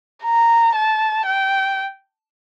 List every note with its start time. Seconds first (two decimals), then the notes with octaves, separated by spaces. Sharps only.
0.24 A#5
0.75 A5
1.26 G5